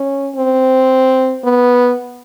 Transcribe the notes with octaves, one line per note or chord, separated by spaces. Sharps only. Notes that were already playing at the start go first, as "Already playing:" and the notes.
Already playing: C#4
C4
B3